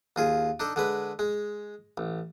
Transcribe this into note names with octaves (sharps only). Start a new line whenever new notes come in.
D#2 F4 G#4
D4 D#4 A4
D3 G#3 B4
G#3
A1